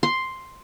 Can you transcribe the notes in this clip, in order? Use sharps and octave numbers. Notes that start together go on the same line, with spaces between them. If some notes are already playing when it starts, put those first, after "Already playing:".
C6